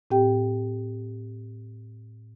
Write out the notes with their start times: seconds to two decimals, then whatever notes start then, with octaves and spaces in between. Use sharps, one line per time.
0.11 A2 C4 G4 G5